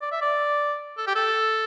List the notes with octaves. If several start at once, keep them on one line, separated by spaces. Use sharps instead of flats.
D5
E5
D5
A4
G4
A4